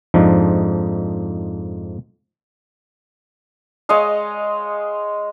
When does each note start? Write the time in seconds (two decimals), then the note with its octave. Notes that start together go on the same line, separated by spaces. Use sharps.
0.14 F2 G#2 F3 D4 D#4
3.89 G#3 C#5 D#5 F5